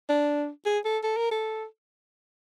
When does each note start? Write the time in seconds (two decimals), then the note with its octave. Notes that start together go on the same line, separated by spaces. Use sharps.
0.09 D4
0.66 G#4
0.85 A4
1.03 A4
1.17 A#4
1.31 A4